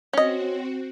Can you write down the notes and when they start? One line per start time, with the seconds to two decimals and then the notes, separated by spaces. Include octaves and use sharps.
0.13 C4 C#4 F#4 D#5